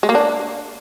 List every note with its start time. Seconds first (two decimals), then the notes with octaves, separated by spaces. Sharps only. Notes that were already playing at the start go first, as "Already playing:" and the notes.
0.03 G#3
0.09 A#3
0.15 D4